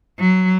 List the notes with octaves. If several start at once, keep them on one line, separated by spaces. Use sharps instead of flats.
F#3